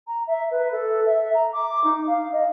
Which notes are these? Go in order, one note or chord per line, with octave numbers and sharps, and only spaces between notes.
A#5
E5
B4
A4
E5
A#5
D6
D#4
F5
D#5